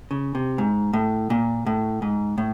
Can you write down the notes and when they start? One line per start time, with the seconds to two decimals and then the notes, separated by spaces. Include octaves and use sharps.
0.11 C#3
0.35 C3
0.58 G#2
0.93 A2
1.30 A#2
1.66 A2
2.02 G#2
2.38 A2